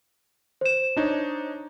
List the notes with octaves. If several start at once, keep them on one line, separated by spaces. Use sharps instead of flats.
C5 E7
D4 D#4 C#5